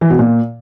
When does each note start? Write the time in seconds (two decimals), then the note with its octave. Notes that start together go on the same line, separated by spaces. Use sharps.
0.01 E3
0.10 B2
0.19 A#2